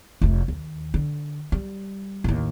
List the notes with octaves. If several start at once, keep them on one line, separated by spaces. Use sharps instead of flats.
F1 A3
D#2
D3
G3
A1 D#2